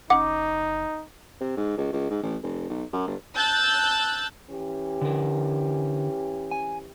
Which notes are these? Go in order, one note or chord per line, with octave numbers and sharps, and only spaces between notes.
F#1 C#4 D#4 F#5 D6
C3
G#2
C#2
C#2
G#2
A1
F1
B1
F#2
G1
A5 E6 F#6 G6 A6
E3 C#4 G4
D3 A#4
G#5